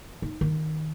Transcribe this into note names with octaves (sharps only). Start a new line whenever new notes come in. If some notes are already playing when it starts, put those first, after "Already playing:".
D#4
D#3